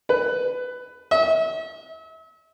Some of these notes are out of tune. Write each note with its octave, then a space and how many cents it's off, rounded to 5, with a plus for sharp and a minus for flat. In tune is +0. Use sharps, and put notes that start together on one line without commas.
B4 +15
E5 -40